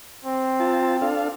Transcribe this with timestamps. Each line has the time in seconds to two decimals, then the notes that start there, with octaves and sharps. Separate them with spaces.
0.25 C4
0.60 F4 A5
1.02 D4 A4 F5